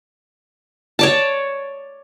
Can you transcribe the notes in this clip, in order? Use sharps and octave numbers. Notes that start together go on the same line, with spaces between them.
C#5 D5 A5